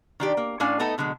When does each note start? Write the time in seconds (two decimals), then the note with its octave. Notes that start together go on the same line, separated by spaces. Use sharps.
0.20 D#3 D4 G4
0.37 A#3
0.60 A2 C#4 D4 F5 G#5
0.79 A3 B3 D#4 A4
0.98 B2 D3 F#3 G#3